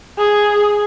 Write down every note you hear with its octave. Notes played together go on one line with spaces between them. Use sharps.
G#4